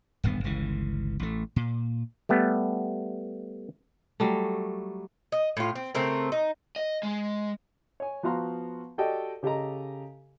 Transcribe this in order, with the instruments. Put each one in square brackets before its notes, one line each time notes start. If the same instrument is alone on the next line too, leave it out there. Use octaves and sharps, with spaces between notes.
[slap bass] D1 G#1 G2 B3
G1 C#2 C#3 E3
A1 A3
A#2
[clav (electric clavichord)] G3 A3 B3
[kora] F#3 G3 A3
[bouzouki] D#5
A2 F4
C4
C#3 A3 C4 A#4
D#4
[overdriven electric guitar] D#5
G#3
[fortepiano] C#5 G#5
F3 B3 F#4 F5 A#5 C6
F#4 G4 A4 D5 D#5 G5
C#3 G4 A4 D#5 A#5